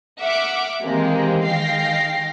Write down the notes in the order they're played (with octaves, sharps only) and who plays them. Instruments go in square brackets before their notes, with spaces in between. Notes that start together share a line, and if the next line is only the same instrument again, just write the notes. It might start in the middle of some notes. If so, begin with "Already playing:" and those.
[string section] E5 F#5 D6 F6
C3 D#3 E3 G#3 A#3 C4
D#3 G#3 F5 G5 A#6 C7